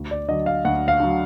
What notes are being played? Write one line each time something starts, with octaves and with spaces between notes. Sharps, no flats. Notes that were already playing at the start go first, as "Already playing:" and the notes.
Already playing: D2
D5
D3 F#3 D#5
F5
D2 F#5
F5
D3 F#3